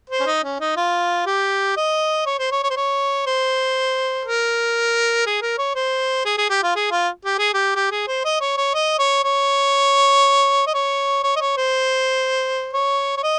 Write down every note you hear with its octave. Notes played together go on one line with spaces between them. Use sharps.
C5
C#4
D#4
C#4
D#4
F4
G4
D#5
C#5
C5
C#5
C#5
C5
C#5
C5
A#4
G#4
A#4
C#5
C5
G#4
G#4
G4
F4
G#4
F4
G4
G#4
G4
G4
G#4
C5
D#5
C#5
C#5
D#5
C#5
C#5
D#5
C#5
C#5
D#5
C#5
C5
C#5
C#5
D#5